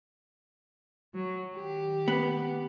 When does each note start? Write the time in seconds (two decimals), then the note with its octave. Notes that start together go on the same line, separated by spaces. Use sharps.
1.14 F#3
1.56 D#3 G4
2.08 B3